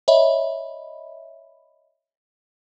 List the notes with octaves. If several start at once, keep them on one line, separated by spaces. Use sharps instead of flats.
C#5 D#5 E5 B5